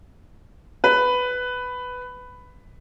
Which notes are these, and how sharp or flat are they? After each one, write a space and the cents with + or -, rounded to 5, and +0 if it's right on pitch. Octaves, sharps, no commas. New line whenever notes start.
B4 +10